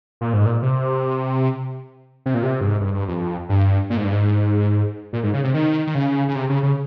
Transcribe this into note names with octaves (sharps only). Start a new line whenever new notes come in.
A#2
G#2
A#2
C3
C3
A#2
C3
G2
G#2
G2
G2
F2
G2
A#2
G#2
G2
G#2
A#2
G#2
C#3
C3
D#3
D#3
C#3
C#3
C3
C#3
C#3